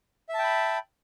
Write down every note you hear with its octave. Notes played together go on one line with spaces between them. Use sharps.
E5 G5 A5 B5